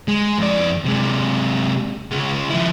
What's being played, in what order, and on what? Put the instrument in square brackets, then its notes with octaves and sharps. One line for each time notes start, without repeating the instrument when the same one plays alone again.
[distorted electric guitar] G#3
F2 D5
C3 G#3
C#2 G#3
F3 E4